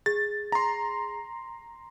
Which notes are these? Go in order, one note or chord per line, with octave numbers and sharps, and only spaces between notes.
G#4 A6
A#5 C6